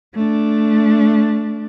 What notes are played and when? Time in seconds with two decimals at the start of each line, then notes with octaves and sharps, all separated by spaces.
0.14 A3 D4